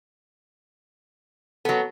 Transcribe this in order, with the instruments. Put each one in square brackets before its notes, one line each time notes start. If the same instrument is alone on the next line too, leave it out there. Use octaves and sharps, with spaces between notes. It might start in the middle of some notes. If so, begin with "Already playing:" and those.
[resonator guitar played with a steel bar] F#3 B3 [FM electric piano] A4